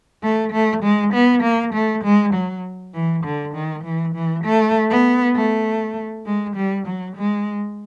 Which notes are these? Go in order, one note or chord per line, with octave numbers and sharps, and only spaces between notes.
A3
A3
G#3
B3
A#3
A3
G#3
F#3
E3
D3
D#3
E3
E3
A3
B3
A3
G#3
G3
F#3
G#3